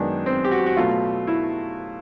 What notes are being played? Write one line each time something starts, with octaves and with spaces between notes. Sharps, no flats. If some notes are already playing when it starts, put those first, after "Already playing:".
Already playing: F#2 D#3 G#3 B3 D4
C4
G4
F#4
F#4
B2 F#3 A3 F4
E4